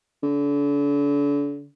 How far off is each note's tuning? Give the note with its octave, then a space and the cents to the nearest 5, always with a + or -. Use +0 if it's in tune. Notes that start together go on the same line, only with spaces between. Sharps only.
D3 -40